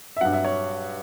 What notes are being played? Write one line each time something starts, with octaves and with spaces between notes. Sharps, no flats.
E5
G2 F#3 F#5
E5
C#5